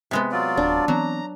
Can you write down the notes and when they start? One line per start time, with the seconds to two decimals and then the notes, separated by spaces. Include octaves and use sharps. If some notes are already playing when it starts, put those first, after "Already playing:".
0.11 C3 G#3 B3
0.32 F#3 F4 D5
0.57 D1 D4
0.88 E3 F#3 B3 C4 A#5